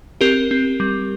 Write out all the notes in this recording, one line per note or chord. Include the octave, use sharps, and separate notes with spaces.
C4 G4 A#4
C4
G3